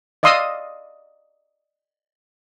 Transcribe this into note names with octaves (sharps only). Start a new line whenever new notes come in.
D5 D#5 F5 C6 D#6 E6